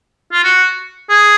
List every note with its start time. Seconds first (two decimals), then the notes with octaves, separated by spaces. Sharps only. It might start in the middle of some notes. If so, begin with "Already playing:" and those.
0.32 F4
0.44 F#4
1.09 G#4